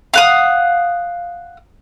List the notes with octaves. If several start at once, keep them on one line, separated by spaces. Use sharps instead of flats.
F5 F#5 D#6